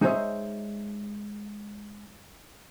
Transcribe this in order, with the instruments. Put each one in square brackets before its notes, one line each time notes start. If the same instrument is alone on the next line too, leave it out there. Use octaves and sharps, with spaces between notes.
[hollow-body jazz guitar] G#3 D#4 G#4 C5 C#5 E5